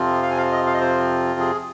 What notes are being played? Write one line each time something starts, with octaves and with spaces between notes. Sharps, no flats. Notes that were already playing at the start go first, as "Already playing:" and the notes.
Already playing: F2 C3 F3 C4 F4
F5
G#5
F5
D#5
F5
D#5
C5
G#4